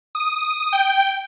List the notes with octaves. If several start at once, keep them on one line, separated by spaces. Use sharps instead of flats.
D#6
G5